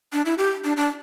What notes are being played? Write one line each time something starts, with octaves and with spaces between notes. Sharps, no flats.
D4
E4
G4
D4
D4